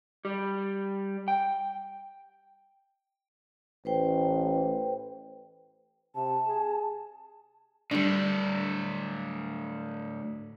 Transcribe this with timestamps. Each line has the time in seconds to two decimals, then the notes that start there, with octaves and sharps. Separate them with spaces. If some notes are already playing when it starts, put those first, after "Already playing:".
0.25 G3
1.28 G5
3.85 A1 B4 C5 G5
6.15 C3 A5
6.47 G#4
7.91 A2 D3 G3 D4